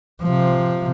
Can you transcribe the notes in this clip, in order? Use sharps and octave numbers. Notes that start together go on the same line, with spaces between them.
C3 F3